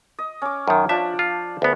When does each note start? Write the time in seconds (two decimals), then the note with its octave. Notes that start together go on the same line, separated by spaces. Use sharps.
0.19 D#5
0.42 C#4 D6
0.68 F#2 D#3
0.89 F3 D4 E5
1.19 F4
1.62 D2 B3